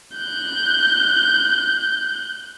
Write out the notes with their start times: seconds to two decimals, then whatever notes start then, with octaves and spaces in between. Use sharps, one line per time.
0.17 F#6 G6